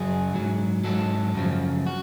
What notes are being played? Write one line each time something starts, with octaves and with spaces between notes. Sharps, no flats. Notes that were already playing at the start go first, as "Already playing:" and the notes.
Already playing: F#2 C#3 F#3 G#4
G#2 F#3
G#2 F#3 A4
F#2 C#3 F3
F#4